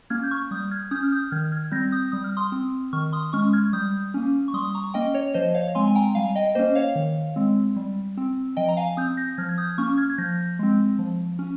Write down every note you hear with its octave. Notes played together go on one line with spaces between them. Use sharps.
A#3 C#4 F6 G#6
G6
C#6 F6
G3 D#6 G6
F6 G#6
C#4 D#6 G6
F6
D#6 G6
D#3 F6 G#6
F6 G#6
G3 C4 G6 A#6
D#6 G6
G3 D#6
F6
C6 D#6
C4
D#3 C#6 F6
C6 D#6
G#3 C#4 C#6 F6
F6 G#6
G3 D#6 G6
A#3 C#4
C#6
G3 C6 D#6
D#6
A#5 C#6
A#3 C#4 D#5 G5
C#5
F3 C5 D#5
C#5 F5
G#3 C4 G#5 C6
G#5
G5 A#5
G3 F5 G#5
D#5 G5
A#3 C#4 C5 D#5
C#5 F5
D#3
G#3 C4
G3
C4
F3 D#5 G5
A#5
F5 G#5
C4 D#6 G6
G6 A#6
F3 F6 G#6
G#6
D#6 G6
A#3 C#4 C#6 F6
F6 G#6
G#6
F3 G6 A#6
G#3 C4
F3
C#4